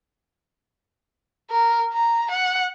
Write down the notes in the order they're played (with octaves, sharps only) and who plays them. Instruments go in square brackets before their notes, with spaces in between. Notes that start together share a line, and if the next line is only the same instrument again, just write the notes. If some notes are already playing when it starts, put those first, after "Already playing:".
[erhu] A#4
A#5
F#5